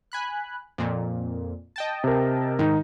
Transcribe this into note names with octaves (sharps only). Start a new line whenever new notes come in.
G#5 B5 F#6
F2 A#2
D#5 G5 A5
C3 A#4
G#2 D#3 D#4